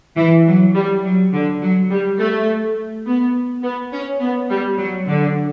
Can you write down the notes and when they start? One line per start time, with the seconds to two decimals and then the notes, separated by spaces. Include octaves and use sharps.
0.18 E3
0.46 F#3
0.76 G3
1.04 F#3
1.33 D3
1.62 F#3
1.91 G3
2.20 A3
3.06 B3
3.63 B3
3.92 C#4
4.20 B3
4.50 G3
4.78 F#3
5.07 D3